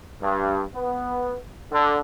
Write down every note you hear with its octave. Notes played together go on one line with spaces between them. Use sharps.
G2
B3
D3